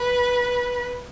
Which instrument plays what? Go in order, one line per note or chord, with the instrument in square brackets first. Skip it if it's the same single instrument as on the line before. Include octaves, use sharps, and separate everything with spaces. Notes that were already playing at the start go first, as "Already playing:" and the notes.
Already playing: [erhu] B4